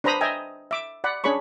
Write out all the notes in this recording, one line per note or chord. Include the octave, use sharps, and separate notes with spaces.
D4 B4 C5 A#5 B5 D#6
D#5 E5 G5 G#5 A#5
E5 D6
D5 F#5 B5
C#4 D4 G#4 C#5 B5 C#6